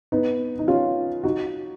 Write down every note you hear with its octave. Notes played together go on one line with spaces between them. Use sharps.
B3 D#4
D#4
C#4 F4
D#4 F#4